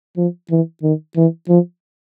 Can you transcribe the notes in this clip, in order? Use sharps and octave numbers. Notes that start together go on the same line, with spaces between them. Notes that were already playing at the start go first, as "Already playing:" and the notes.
F3
E3
D#3
E3
F3